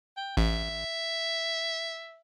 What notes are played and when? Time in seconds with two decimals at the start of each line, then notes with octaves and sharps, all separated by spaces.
0.17 G5
0.37 A1 E5